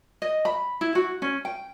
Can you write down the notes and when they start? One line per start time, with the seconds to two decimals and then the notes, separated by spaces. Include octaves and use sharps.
0.22 D#5
0.45 B5
0.81 E4
0.95 F#4
1.22 C#4
1.45 G5